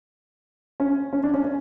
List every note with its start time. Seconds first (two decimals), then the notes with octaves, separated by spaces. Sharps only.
0.80 C#4
1.13 C#4
1.23 D4
1.34 C#4
1.44 C#4